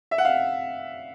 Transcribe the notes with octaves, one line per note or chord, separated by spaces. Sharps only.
E5
F#5
F5